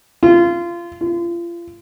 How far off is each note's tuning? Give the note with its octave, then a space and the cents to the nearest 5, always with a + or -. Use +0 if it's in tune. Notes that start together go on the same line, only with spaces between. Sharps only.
F4 -25
F4 -35